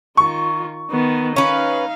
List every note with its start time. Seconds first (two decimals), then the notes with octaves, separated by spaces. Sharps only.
0.17 D#3 F4 C#6
0.90 D#3 B3
1.36 C#4 D#4 B4 F5